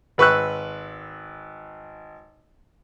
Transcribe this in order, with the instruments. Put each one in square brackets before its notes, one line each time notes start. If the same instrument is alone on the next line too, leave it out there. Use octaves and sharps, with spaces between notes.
[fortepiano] G#1 B4 C#6 E6 F#6